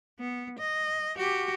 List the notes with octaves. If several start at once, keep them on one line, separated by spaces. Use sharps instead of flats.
B3
D#5
F#4 G4